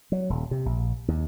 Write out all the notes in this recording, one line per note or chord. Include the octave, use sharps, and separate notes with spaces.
F#3
D#1
C3
A#1
D#2